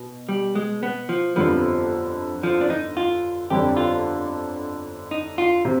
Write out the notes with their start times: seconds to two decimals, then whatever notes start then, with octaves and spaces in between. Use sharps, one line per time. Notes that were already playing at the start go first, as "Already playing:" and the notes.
Already playing: B2
0.29 G3
0.55 G#3
0.83 B3
1.09 F3
1.36 G1 F2 D3 F3 G3 B3
2.43 F3
2.61 D4
2.70 D#4
2.97 F4
3.50 G1 F2 D3 G3 D4 G4
3.77 F4
5.11 D#4
5.38 F4
5.65 C3